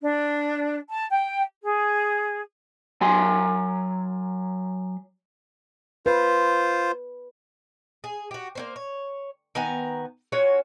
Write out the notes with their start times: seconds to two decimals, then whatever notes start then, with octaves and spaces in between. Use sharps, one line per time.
0.02 D4
0.89 A5
1.11 G5
1.63 G#4
3.01 F#3 G#5 C6
6.06 F4 B4 C5
8.04 G#4
8.31 F#4 G4
8.55 A#3 C#4 C5
8.76 C#5
9.55 D#3 B3 G#5 A#5
10.32 C#4 F4 F#4 C#5